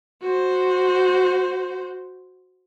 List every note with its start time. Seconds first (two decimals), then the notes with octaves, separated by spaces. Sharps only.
0.22 F#4 C5